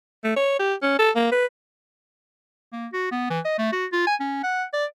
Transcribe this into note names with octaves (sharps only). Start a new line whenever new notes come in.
A3
C#5
G4
C#4
A4
A#3
B4
A#3
F#4
B3
E3
D#5
A3
F#4
F4
G#5
C#4
F#5
D5